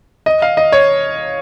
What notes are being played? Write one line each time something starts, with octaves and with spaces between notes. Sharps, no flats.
D#5
F5
D#5
C#5